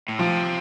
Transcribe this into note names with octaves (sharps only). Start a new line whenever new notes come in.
A2
C3 F3